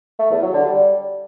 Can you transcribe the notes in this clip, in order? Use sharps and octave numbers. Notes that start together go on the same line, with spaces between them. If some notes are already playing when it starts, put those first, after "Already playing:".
A3
E2
F#3
D3
G3